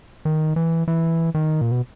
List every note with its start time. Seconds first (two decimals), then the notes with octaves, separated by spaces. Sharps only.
0.25 D#3
0.56 E3
0.88 E3
1.35 D#3
1.61 A#2
1.71 B2